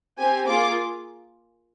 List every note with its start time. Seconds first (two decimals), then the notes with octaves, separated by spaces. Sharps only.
0.18 C4 G4 G#5
0.47 A#3 F4 G#4 D6